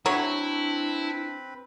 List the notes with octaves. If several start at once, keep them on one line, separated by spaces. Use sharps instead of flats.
F#3 C4 D4 E4 B4 C#5 B5